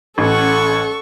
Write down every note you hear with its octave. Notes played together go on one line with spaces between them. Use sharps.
A1 C#4 A4 F#5 C#6